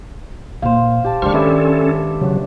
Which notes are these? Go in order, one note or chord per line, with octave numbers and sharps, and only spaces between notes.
A#2 C5 F5
G4 A5
D#3 G#3 D4 G4 C5 C#6 F6
C#4 A4 B4 E5
C#3 F#3